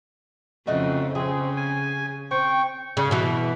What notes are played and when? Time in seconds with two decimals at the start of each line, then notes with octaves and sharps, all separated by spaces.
0.67 F2 C#3 A3 D#4 F#4
1.15 C#3 C4 G#4
1.57 G#5
2.31 C4 G5 C#6
2.97 C#3
3.11 B2 E3